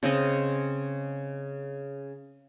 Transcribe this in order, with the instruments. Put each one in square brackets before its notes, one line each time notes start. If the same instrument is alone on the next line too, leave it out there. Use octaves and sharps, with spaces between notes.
[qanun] C#3 C4 D#5